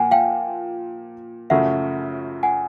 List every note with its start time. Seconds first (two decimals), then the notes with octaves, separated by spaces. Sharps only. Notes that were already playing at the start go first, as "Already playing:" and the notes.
Already playing: A#2 F3 A#3 F#5 G#5
0.11 F5 G5
1.50 F#2 C#3 F3 A3 C#4 E5 F#5
2.43 F#5 G#5